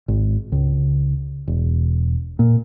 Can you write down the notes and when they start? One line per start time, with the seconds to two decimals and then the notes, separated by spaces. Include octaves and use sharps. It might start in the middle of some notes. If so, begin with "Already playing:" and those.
0.08 G#1
0.52 C#2
1.48 E1
2.39 A#2